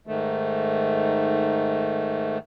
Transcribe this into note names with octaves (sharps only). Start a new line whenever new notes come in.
G#2 D#3 A3